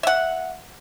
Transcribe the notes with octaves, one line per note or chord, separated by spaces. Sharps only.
E5 F#5